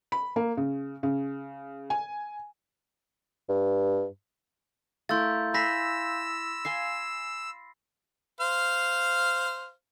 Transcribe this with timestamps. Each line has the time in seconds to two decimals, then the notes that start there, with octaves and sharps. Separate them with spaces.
0.12 B5
0.36 A#3
0.57 C#3
1.03 C#3
1.90 G#5
3.49 G2
5.09 A3 E4 A#4 F5 C6 E6 G6 A6
5.54 G#5 B5 C6 E6 A#6 B6
6.65 F5 G#5 C6 C7
8.40 C5 F5 F6